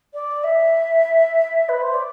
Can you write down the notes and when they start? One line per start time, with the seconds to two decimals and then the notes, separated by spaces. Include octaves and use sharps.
0.13 D5
0.43 E5
1.68 B4
1.81 C5
1.93 D5